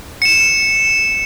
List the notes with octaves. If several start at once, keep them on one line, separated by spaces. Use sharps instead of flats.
C#7 E7